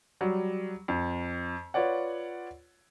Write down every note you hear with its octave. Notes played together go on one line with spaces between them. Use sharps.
F#3 G3
F2
F4 B4 C#5 D5 F#5